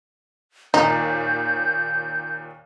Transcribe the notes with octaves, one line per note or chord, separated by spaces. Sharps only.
D#2 A#2 D#4 G6